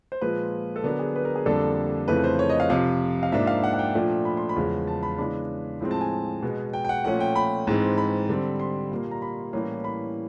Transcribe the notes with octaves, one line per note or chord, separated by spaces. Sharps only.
C5
A#2 F3 G#3 B4
A4
D3 F#3 B3 D4 A#4
G#4
B4
A#4
G#4
F2 D3 G3 A#3 D4 A4
F2 C#3 E3 A3 B4
C5
C#5
D#5
F5
F2 C3 F3 F5
F5
G#2 F3 A#3 D4 E5
F5
F#5
F#5
G5
A#2 F3 A3 D4
B5
C6
B5
E2 C#3 F3 G#3
A5
B5
C#3 E3 G#3 B3 D4 B5
A2 F3 G#3 C4
A5
G#5
B2 G#3 B3
G5
G5
F#5
A#2 F3 A3 C#4 F#5
G5
B5
G#2 E3 G#3 C4
B5
D3 G3 C4
C6
A#2 G3 A#3
A#5
B5
A2 E3 G3 A#3 C#4
B5